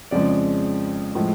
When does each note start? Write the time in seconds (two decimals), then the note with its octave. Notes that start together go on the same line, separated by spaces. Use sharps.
0.11 F2 C#3 F3 G#3 D5
1.15 A2 F3 G#3